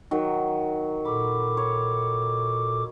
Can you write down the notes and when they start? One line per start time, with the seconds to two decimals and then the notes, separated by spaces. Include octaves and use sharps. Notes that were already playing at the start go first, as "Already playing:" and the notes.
0.11 D#3 F#3
1.05 A#2 A4 B5 D6
1.57 C#5